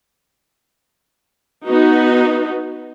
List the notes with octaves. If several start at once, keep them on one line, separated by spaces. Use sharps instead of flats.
B3 D#4 F#4